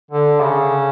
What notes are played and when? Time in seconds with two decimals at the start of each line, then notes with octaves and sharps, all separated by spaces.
0.11 D3
0.41 C#3